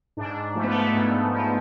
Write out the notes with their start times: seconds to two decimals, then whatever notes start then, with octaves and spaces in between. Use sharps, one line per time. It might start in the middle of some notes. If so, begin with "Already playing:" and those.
0.17 G#2 D4
0.55 F3 A3
0.64 B3
0.72 A3
0.93 G#2
1.32 F3